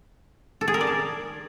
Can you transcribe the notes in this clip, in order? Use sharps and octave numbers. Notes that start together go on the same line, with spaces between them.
A4
G#4
A#4
D5
A5